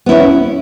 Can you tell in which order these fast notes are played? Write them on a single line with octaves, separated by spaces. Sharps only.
B3 E4 C#4